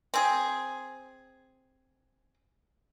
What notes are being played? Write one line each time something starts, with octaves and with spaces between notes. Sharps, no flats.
C4 G#4